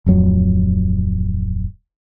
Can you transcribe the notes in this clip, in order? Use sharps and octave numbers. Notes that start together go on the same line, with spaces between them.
D1 F2 F#3